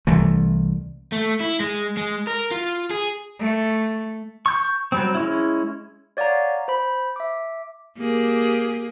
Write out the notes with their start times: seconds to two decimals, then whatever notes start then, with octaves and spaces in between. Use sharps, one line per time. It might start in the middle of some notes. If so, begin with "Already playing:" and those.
0.07 C2 E3 A3
1.12 A3
1.40 E4
1.60 G#3
1.97 G#3
2.27 A#4
2.51 F4
2.91 G#4
3.39 A3
4.46 C#6 G6
4.92 F#3 G3 C4
5.15 G#3 C#4 E4
6.17 C#5 D5 F5 F#5 A#5
6.68 C5 B5
7.16 E5 D6
7.97 A#3 G4 G#4